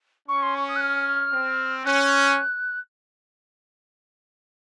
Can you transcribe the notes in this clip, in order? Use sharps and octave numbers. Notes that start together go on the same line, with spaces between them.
C#4 C#6
C6
C#6
D#6
F#6
F6
C4
C#4 F#6